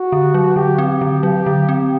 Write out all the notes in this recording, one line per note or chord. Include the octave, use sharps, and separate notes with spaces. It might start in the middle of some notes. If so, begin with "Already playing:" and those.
Already playing: F#4
D3
F#3
D3 G4
C4
D3
F#3
D3
C4